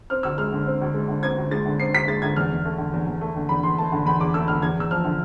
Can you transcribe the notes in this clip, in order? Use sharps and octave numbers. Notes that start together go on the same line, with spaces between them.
C4 F6
D2 E6
G#3 F6
D3
C4
D2
G#3
D3
C4 G#6
D2
G#3 A6
D3
C4 C7
D2 B6
G#3 A6
D3 G#6
E2 F6
E2
A3
D3
E2
E2
A3
D3
E2 B5
E2 C6
A3 A5
D3
E2 B5
E2 D6
A3 E6
D3 F6
E2 G#6
E2 E6
F3 F6
D3